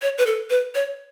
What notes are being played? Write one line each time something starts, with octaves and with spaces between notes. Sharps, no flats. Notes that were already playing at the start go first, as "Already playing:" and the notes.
C#5
B4
A4
B4
C#5